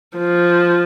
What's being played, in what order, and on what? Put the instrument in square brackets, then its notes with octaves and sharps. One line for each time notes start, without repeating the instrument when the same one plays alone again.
[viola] F3